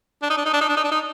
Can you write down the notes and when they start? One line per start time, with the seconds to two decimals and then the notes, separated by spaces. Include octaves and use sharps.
0.23 D4
0.30 D#4
0.38 D4
0.46 D#4
0.54 D4
0.61 D#4
0.69 D4
0.77 D#4
0.84 D4
0.92 D#4